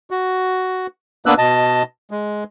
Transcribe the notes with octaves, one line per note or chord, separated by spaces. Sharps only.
F#4
A#3 B3 D4 B4 E6 F#6
B2 D#5 A5
G#3